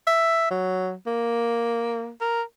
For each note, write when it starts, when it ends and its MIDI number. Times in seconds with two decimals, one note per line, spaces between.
0.07 0.48 76
0.51 0.93 54
1.07 2.10 58
2.21 2.42 70